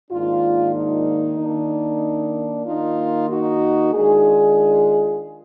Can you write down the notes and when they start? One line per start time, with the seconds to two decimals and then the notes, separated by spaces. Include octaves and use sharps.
0.11 G#2 D#3 A#3 D4 F4
0.75 D#4
1.38 D#3 A#3 D4
2.66 D#3 A#3 D#4 F4
3.29 D#4 F#4
3.93 D#3 G#3 D4 F4 G#4